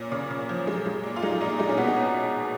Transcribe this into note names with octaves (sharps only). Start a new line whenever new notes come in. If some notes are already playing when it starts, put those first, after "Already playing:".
Already playing: A#2 C#4
C#3
C#3
F3
G#3
G#3
A#2
F4
G#3 D#4
A#2 D#4
G#3 D#4
C#4
B2 B3
D#4